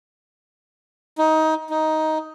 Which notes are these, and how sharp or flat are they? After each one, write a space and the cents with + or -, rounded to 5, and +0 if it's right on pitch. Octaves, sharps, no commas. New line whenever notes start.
D#4 +20
D#4 +10